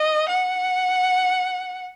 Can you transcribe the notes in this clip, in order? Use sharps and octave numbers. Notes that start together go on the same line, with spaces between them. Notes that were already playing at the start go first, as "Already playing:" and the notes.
Already playing: D#5
F#5